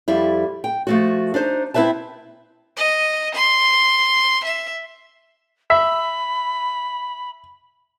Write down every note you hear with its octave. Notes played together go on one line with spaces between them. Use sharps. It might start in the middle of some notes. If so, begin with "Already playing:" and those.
F2 G3 E4
G5
F3 A3 F#4
D4 D#4 C5
C4 E4 G#4 B4 E5 A5
D#5
C6
E5
E5 B5